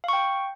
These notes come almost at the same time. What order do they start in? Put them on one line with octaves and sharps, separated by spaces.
F5 C#6 G5